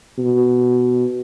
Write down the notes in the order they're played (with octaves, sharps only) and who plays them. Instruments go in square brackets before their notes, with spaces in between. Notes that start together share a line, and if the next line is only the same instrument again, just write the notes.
[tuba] B2